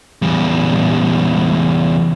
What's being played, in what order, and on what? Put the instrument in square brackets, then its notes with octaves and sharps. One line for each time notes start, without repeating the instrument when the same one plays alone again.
[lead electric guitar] E2 G3